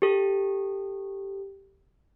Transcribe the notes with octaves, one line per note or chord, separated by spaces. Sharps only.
G4 A4